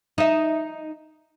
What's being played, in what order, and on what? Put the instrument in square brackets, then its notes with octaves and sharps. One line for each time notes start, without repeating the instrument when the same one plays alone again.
[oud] D#4 E5